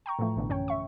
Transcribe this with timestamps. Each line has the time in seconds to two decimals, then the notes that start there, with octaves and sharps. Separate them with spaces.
0.06 G5 A#5 C#6
0.19 A2 E3 F3 A3
0.36 A1 B2 D3 E3
0.49 F#2 C#4 C#5 G5
0.68 E5 C#6